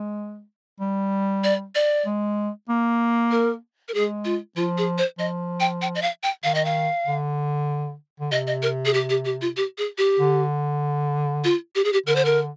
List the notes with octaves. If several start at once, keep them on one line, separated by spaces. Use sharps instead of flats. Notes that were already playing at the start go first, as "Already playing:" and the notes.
Already playing: G#3
G3
D5
D5
G#3
A#3
A#4
A#4
G#3 G#4
F4
F3 F4
G#4
C5
F3 D#5
G5
G5
D#5
F5
G5
D#3 F5
D#5
F5
D3
D3
C3 D#5
D#5
A#4
G#4
G4
G4
G4
F4
G4
G#4
G4
D3
F4
G4
G#4
G4
D3 A#4
C5
A#4